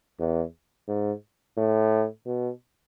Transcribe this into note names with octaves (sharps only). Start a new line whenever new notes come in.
E2
G#2
A2
B2